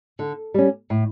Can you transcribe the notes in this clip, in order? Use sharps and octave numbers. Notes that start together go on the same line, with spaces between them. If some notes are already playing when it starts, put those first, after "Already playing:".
D3
G3 C#4
A2